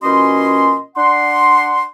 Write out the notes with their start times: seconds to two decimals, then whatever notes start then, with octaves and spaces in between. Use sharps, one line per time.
0.03 A#2 E3 C#4 F#4 D#5 C6
0.96 D4 F#5 C6